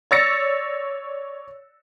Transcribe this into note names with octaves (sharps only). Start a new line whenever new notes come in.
C#5 D5 E6 A6 A#6 C#7